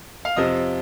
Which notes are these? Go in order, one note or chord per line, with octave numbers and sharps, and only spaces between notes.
F5
F2 C3 F3 D#5